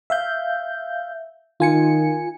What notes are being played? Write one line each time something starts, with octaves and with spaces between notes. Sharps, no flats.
E5 F5 G6
D#3 F4 G#5 C#7